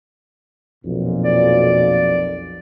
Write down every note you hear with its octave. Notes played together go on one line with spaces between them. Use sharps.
B1 F2 A#2
D5